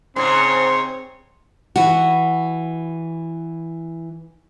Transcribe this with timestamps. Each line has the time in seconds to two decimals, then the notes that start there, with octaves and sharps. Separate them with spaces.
0.16 G#2 C#3 C4 C#5 A#5 C6
1.76 E3 F#4